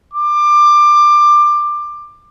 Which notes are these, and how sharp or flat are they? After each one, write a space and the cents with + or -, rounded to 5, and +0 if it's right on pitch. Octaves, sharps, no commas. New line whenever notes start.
D6 +20